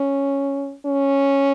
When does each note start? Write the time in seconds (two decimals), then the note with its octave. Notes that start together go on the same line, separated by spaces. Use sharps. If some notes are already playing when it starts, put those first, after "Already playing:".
Already playing: C#4
0.86 C#4